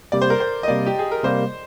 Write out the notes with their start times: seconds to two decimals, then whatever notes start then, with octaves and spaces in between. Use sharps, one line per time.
0.12 C3 G3 A#3 D5
0.22 C5
0.30 A#4
0.40 C5
0.63 D#5
0.68 C3 G3 A#3 D5
0.86 G4
0.99 G#4
1.12 A#4
1.24 C3 G3 A#3 C5